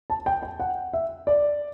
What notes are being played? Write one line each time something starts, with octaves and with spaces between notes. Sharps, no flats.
A5
G5
G5
F#5
E5
D5